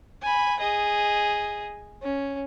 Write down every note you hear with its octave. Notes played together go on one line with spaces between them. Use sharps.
G#5 B5
G#4 D#5
C#4